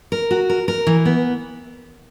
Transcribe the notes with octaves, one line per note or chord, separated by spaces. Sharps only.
A#4
F#4
A#4
A#4
E3
B3